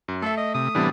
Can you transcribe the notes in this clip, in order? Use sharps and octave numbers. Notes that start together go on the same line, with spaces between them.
F#2
A3 A4 E5
D#5
C3 D#6
A2 C3 E3 G3 B3 D4